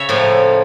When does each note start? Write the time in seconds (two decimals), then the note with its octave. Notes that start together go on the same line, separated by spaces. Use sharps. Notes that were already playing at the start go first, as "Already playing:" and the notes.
Already playing: C#3 C#5 E5
0.09 A2 F3 A#3